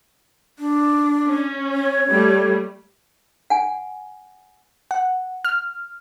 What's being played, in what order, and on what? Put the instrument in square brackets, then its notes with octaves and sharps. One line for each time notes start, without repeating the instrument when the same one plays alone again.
[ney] D4
[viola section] C#4
[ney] C#5
[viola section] G3 A3
[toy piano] F#5 G#5
[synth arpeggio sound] F#5
F6